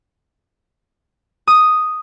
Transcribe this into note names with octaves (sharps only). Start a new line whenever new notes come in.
D#6